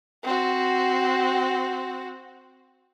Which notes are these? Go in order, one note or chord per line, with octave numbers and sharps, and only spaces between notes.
C4 F#4